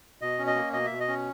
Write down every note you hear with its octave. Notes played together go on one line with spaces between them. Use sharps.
B2 D#5
C#4
D#5
A#3
B2 D#5
B2 E5
D#5
C#4